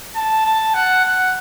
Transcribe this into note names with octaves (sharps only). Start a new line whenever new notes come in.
A5
A5
F#5
F#5